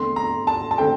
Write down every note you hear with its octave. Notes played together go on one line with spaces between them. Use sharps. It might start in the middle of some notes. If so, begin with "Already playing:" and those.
Already playing: E2 D3 A3 C4 C6
A#5
A5
A5
D3 A3 C4 G5